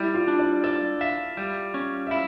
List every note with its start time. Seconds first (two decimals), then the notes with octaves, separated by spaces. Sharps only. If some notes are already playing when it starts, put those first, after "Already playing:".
Already playing: G3 E4
0.14 F4
0.28 D4
0.39 D5
0.64 A4 D5
1.01 E5 F5
1.37 G3
1.74 C#4
2.07 E5
2.11 E4 F5